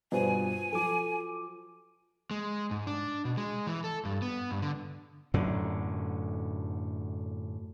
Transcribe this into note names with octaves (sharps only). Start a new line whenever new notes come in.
G2 B2 F4 B4 C5 G#5
F3 F#3 A4 D6
G#3
G#2
D4
B2
G#3
E3
A4
G2
B3
G2
D3
F#2 A2 D3